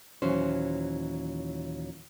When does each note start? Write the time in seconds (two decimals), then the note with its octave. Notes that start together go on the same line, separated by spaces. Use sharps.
0.22 D#2 A#2 E3 F#3 C#4 C5